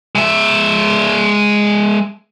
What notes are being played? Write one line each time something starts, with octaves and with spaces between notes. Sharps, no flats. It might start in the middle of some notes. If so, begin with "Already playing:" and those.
G#3 E5